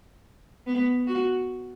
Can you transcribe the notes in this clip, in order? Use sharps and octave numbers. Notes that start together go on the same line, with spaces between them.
B3
F#4